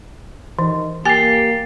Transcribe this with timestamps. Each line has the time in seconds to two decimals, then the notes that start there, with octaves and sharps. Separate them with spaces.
0.59 D#3 E3
1.05 A#3 G4 G#5 A6 C7